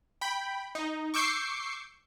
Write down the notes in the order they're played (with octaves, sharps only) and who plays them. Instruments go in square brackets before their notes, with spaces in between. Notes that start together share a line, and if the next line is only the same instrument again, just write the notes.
[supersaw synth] G5 B5
D#4
C#6 D6 E6 G6 C7 C#7